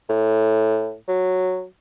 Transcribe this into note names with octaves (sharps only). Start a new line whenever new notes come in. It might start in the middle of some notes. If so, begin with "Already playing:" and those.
A2
F#3